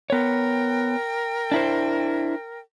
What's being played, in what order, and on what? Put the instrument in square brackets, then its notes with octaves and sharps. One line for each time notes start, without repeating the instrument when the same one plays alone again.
[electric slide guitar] B3 C#5 [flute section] A#4 G5
[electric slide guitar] D4 E4 C5